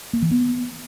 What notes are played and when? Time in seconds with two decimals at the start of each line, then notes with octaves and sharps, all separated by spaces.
0.13 A#3
0.22 E3
0.31 B3